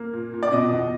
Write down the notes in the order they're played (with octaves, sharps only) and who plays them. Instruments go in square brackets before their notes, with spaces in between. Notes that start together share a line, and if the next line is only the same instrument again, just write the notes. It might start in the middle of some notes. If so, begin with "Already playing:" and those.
Already playing: [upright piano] A#3
A#2
A#2
D5
B2 D#5
E2